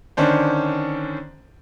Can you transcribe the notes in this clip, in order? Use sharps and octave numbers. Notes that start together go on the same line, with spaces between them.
D3 D#3 C#4 D4 C5